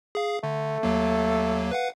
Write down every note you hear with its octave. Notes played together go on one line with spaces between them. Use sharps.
G#4 F5
D3 A3
D#2 F#3 A#3
B4 F5 F#5